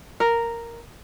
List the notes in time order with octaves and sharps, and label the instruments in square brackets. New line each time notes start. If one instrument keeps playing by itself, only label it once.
[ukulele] A#4